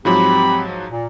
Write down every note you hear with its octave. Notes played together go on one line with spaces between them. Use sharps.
G#2 F3 F#3 C4 G4 B5
A#2